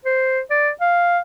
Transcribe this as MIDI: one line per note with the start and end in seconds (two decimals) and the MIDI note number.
0.05 0.40 72
0.51 0.71 74
0.81 1.19 77